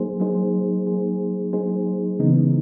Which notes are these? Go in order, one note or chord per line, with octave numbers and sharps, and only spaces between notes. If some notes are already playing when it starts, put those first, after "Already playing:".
Already playing: F#3 A#3 D#4 G#4 C5
F#3 A#3 D#4 G#4 C5
F#3 A#3 D#4 G#4 C5
F#3 A#3 D#4 G#4 C5
C#3 E3 G#3 B3 D#4